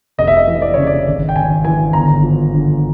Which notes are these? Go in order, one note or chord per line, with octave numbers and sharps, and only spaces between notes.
F1 D#5
E5
D#5
E3
D5
C#3 C#5
D5
G#1
G5
G#1 G#5
E3 G#5
G1 A#5
F3
D3